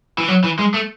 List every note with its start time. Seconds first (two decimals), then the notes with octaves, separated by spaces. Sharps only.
0.18 E3
0.28 F#3
0.44 E3
0.59 G#3
0.74 A3